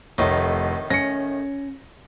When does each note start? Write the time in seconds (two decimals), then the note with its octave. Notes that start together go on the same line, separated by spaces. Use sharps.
0.18 F1 A2 D#3
0.90 C#4 A#6 C#7